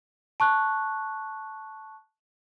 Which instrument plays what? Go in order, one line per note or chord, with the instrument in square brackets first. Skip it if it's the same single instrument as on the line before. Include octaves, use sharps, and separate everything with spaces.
[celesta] A5 C#6 F#6